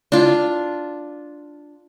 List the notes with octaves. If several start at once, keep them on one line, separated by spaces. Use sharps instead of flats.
D4 F4